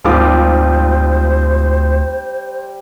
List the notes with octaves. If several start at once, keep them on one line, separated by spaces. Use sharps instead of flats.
G#1 D2 G3 F4 C5 D6